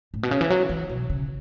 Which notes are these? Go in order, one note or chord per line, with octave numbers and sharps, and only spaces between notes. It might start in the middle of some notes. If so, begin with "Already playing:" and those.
A2
B2
C#3
E3
F#3
E3
B2
C#3